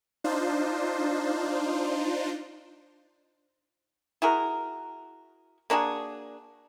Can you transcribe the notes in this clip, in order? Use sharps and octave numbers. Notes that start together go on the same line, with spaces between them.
D4 D#4 F4 C5
E4 F#4 G#4 A#4
A#3 D4 F#4 G#4